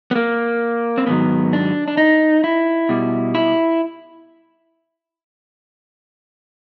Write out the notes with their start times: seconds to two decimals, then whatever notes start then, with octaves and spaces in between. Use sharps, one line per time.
0.11 B3
0.15 A#3
0.98 C4
1.07 G#2 D#3 F#3 B3
1.53 D4
1.88 D4
1.97 D#4
2.44 E4
2.89 B2 G3
3.35 E4